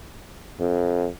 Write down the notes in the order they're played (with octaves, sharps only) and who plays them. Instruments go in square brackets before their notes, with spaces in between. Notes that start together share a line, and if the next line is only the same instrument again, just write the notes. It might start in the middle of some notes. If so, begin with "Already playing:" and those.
[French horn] F2